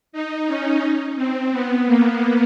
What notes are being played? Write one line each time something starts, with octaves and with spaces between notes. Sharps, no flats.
D#4
C#4
C4
B3
A#3